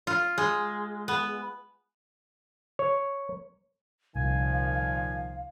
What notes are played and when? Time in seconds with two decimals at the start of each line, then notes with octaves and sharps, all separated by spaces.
0.07 F4
0.38 G#3
1.08 B3
2.79 C#5
4.16 C2 A#2 D#3 F3 F5 G#5